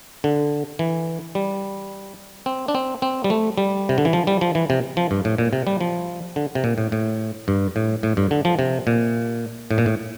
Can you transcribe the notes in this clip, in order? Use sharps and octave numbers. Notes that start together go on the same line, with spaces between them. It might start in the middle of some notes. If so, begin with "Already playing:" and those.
D3
E3
G3
C4
D4
C4
C4
G3
A3
G3
C3
D3
E3
F3
G3
F3
E3
C3
F3
G2
A2
A#2
C3
G3
F3
D3
C3
A#2
A2
A2
G2
A2
A2
G2
D3
F3
C3
A#2
A2
A#2
A2